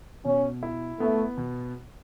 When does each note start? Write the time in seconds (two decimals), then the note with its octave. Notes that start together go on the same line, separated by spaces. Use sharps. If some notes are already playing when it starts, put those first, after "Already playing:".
0.25 B2 C#4
0.63 E4
1.00 A3 B3
1.38 B2